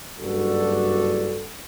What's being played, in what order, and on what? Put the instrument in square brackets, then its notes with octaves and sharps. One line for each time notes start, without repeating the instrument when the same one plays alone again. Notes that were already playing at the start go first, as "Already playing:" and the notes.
[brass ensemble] F#1 G2 D4 F#4 A4